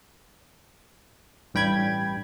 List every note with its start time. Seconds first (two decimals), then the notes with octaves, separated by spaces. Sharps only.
1.54 A1 G2 G5 B5 G#6